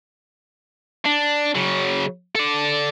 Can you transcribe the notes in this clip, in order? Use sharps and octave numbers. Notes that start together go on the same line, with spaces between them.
D4
C#3 F#3
A4 D5